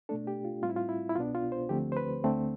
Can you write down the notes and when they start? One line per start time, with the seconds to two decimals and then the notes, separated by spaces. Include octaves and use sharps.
0.09 B2 A3 D4 A4
0.27 G4
0.45 F4
0.62 A2 G3 C4 F4
0.69 E4
0.76 F4
0.89 E4
1.09 E4
1.16 C2 B2 B3 D4 F4
1.35 F4
1.52 C5
1.69 D2 D3 F3 A3 C4 G4
1.92 C5
1.97 B4
2.24 D2 D3 A3 C4